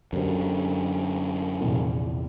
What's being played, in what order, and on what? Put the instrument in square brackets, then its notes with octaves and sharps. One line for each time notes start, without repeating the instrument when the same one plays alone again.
[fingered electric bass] F#2 D3 [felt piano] G4 A#4 C5
[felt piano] A#1 E2 C3